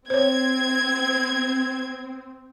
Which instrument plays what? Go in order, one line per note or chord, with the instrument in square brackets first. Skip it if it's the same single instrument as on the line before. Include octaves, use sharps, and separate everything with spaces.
[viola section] C4 [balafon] C5 C#5 [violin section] G#6